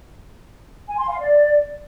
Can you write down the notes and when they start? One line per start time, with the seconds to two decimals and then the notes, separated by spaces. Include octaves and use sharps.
0.87 G#5
0.98 C6
1.08 F5
1.19 D5